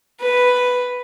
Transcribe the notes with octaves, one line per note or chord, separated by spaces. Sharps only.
B4